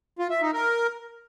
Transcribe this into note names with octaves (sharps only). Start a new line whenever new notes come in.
F4
E5
D#4
A#4